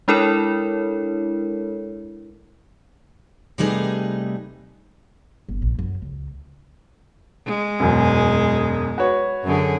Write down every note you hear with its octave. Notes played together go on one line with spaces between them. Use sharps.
G#3 D4 E4 A4 A#4 C#5
C3 G3 A3 D#4 G#4 B4
G1
A#1
F#2
C#2
G#3
E1 F#2
F#4 B4 C#5
F#2 D3 G#4